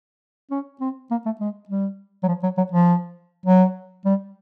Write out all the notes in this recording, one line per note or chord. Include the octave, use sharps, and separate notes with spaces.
C#4
C4
A#3
A3
G#3
G3
F#3
F3
F#3
F#3
F3
F#3
G3